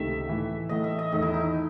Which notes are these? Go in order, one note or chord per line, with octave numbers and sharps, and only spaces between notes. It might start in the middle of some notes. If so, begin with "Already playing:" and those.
Already playing: C#2 C3 D#3 A3 E5
A2 E3 A3
A2 E3 A3 D#5
E5
D#5
E2 D#3 A3 D#5
E4
D#4